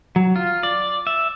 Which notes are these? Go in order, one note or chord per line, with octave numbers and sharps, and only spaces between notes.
F#3
F4
D5
E5